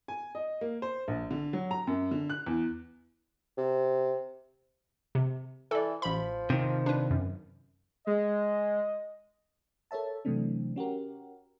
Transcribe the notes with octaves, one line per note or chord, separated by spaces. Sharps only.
G#5
D#5
A#3
C5
A#1
D3
F#3
A#5
F#2
D3
F#6
E2
C3
C3
E3 A4 D5
A1 F3 B5
C3 D#3
D4 B4
F#2
G#3 D#5
A4 A#4 C#5 E5 A5
C3 E3 F#3 A3 C4 D4
C#4 F#4 G4 A#4